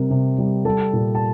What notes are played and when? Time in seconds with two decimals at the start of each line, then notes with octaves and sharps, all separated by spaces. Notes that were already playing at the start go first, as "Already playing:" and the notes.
Already playing: C3 G3 A#4
0.10 C3
0.38 G3
0.65 G3 A4 A5
0.93 A#2
1.15 A5